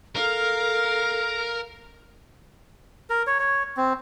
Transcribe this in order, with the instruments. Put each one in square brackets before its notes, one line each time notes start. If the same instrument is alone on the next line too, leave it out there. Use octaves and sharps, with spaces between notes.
[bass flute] A4 [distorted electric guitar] A#4 [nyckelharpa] F5
[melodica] A#4
C#5
C#5
C4